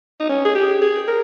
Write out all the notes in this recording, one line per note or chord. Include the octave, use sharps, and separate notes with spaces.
D#4
C#4
G#4
G4
G#4
A#4